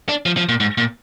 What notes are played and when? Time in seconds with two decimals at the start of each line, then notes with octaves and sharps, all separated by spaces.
0.09 D4
0.26 F3
0.37 F3
0.49 A#2
0.60 G#2
0.78 A#2